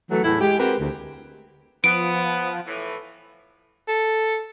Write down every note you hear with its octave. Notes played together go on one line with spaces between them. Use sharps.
E3 F#3 A3
E2 A2 E4
G#3 G4
G#3 C4 F#4 G4 A#4 B4
D2
F3 B3 D7
A2 E3
A4